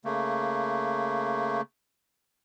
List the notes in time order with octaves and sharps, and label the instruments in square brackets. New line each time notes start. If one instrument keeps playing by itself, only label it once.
[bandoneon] C#3 A3 A#3